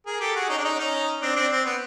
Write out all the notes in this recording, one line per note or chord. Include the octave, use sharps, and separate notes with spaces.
G#4 A#4
G4 A4
F#4 G#4
C#4 D#4
D4
C#4 D#4
C#4 D#4
C4 D4
C4 D4
C4
B3